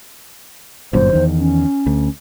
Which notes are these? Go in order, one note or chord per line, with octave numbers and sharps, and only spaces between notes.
G1 F#2 A#2 C5
E2 D#3
C#4
D2